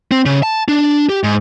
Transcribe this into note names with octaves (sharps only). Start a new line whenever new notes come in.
C4
C#3
A5
D4
G4
G#2